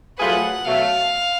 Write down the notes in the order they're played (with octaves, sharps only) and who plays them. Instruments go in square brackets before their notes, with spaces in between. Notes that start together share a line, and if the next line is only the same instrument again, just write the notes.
[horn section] F#3 A3 F4 G#4 B4 [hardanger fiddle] F#5
[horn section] B2 F#3 A3 [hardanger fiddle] F5